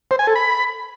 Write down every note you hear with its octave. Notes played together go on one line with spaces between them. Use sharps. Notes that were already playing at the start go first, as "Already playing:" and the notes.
C5
G#5
A4
B5